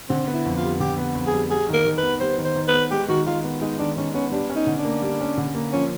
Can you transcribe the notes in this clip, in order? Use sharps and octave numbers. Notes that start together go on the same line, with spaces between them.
D3 C4
B3
E4
F2
F4
G3
D3 G4
B3
F2
G#4
G3
G3 G#4
D#3 A#4
D#3
B4
B3
G3 C5
D#3
C5
D#3
B4
B3
G#3 G4
D#3 F#4
D#3 F4
B3
G#3 D#4
D#3 D4
D#3 C#4
B3 C#4
G3 D4
C#4
D#4
D3
D4
A#3
G3
C#4
D3
A#3
F3 C#4